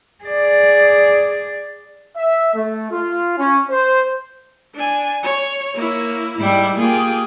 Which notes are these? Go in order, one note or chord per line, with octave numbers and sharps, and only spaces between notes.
G#4 D5
E5
A3
F4
C#4
C5
D4 G#5
C#5
A#3 E4 C#5
G#2 G3 E4
A#3 F4 G4 G#4